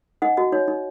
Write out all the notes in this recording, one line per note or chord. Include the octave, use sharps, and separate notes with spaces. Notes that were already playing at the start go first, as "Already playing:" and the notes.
D#4 D#5 F#5
F#4 D#5
D#4 C#5
D#4